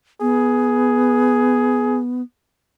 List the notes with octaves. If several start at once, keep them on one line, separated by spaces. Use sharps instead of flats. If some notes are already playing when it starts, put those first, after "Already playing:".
B3 G#4